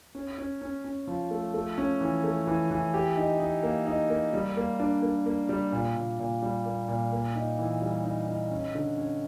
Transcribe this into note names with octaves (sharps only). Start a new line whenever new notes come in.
C#4
C#4
C#4
C#4
F3
A3
A3
C#4
E3
A3
E3
E3
G4
D#4
D#4
A#3
D#4
A#3
G3
A#3
D4
A#3
A#3
G3
A#2
A#2
A#2
G3
A#3
A#2
A#3
D#4
E3
G3
D#4
D#4
C#4
D3
C#4